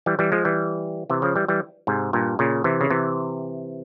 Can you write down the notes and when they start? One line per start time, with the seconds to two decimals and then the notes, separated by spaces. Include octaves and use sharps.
0.06 E3 G3
0.19 E3 G3
0.32 F3 G#3
0.45 E3 G3
1.10 C3 E3
1.22 C#3 F3
1.36 E3 G3
1.48 E3 G3
1.87 G#2 C3
2.13 G2 A#2
2.39 A#2 C#3
2.64 C3 E3
2.81 C#3
2.90 C3 E3